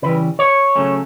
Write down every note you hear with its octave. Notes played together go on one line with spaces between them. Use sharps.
C#3 E3 G3 B4
C#5
C#3 F#3 A3 C#4